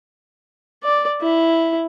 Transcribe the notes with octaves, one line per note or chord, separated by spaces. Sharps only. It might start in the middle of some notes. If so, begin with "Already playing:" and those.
D5
E4